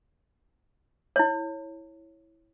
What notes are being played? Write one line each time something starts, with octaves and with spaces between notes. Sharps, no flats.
E4 C#5